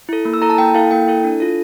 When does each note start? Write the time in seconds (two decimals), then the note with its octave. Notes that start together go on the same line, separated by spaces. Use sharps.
0.09 E4 A4
0.25 A#3
0.34 E6
0.41 E4 A4 A#5
0.50 A5
0.58 A#3 G5
0.74 E4 A4 F5
0.91 A#3 G5
1.08 E4 A4
1.24 D4
1.40 F4 A4